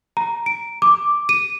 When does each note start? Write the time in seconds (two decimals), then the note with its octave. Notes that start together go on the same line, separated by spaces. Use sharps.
0.17 A#5
0.46 D7
0.82 D6
1.29 D#7